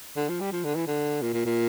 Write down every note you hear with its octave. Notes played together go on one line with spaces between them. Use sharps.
D3
F3
G3
F3
D3
E3
D3
A#2
A#2
A#2